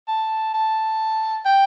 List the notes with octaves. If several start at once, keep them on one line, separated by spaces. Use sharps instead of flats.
A5
A5
G5